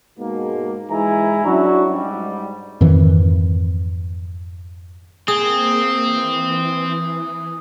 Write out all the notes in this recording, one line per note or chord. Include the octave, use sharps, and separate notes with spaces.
G#2 B2 G#3 A#3
G#2 E3 G#3 E4 G#5 A#5
F#3 C#4 D4 E4 F#4
G#2 G3
F2 G#2 D#3 E3
A#3 C4 G#4 D#6
E3